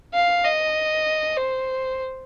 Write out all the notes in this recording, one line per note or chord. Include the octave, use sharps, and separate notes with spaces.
F5
D#5
C5